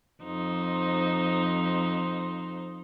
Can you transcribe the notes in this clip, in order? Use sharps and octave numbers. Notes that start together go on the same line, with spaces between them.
F2 D#4 C5